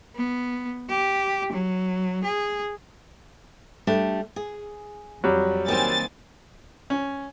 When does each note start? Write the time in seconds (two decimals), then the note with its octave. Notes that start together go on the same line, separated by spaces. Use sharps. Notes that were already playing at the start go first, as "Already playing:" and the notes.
0.15 B3
0.90 G4
1.52 F#3
2.24 G#4
3.87 G3 A3 D4
4.36 G#4
5.24 F2 F#3 G3
5.68 D#3 A#3 C4 G#5 A6
6.90 C#4